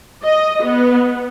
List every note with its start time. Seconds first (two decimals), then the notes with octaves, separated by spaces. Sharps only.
0.23 D#5
0.63 B3